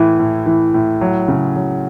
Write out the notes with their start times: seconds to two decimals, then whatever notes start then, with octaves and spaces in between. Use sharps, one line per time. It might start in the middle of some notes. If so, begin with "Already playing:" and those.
Already playing: A2 E3
0.19 A2
0.46 E3
0.74 A2
1.01 F#3
1.28 C#3
1.56 F#3